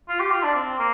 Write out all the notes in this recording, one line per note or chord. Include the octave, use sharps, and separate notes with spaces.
F4
G4
F4
D4
C4
A#3